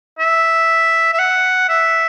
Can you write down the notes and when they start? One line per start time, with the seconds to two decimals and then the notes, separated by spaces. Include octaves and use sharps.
0.19 E5
1.14 E5
1.19 F#5
1.69 E5